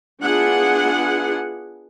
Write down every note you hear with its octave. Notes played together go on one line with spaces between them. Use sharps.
B3 D4 E4 F4 G#4 F#5